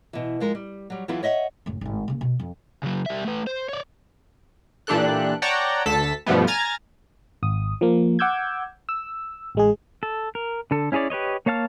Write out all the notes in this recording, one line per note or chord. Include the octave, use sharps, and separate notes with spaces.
B2 E3
F3 G#3 A#4
G3
F#3 G3
E3 F#3 B3 E4 F4 G#4
C#5 D#5 E5 F#5
F#1 A2
G#1 A2
C#3 A#3
B2
F2
C#3 F#3
G3 E5
A3 B4
C5
C#5 D5
A#2 E3 D4 G4 A4 F#6
C#5 D5 F#5 G5 A5 A#5
D2 A4 A5 B6
G2 B2 F3 G3 A3 B3
G#5 A#5 F6 G#6 A6
G#1 D#6
F3 A#3
F#5 D6 E6 G6 G#6
E6
A1 G#3 G#4
A4
A#4
D3 A4
C#4 E4 G#4 C#5 D5
G4 B4 C#5 D#5
A#3 C#5 F5 A5 F6